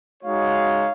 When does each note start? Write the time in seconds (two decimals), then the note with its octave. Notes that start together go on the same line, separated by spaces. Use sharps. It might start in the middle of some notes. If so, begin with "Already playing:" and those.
0.24 G#3 D#4 F#4 C#5 F5